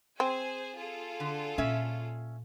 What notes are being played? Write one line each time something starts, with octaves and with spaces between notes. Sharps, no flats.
C4 G#4 C5 G#5
F4 G#4 A4
D3
A#2 C#4 E5